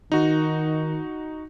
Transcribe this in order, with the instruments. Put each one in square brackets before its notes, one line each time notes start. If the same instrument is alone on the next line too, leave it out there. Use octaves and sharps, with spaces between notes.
[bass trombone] D#3 [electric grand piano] D#4 F#4